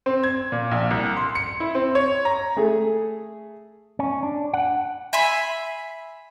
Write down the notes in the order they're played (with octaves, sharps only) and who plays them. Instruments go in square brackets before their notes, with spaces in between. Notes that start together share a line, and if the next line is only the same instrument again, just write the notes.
[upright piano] C4
G#6
A#2
A#1
C2
C6
C#7
E4
C4
C#5
A#5
[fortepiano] A3 G#4 A4
[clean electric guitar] C#4
D4
F#5
[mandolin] E5 G#5 B5 C6